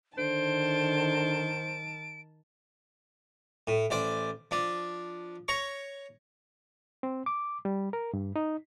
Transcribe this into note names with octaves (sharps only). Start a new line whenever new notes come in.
D3 D#3 C5 A5 D7
A2
A1 C5 D5
F3 D4
C#5 A#5 C#6
C4
D6
G3
A#4
G2
D#4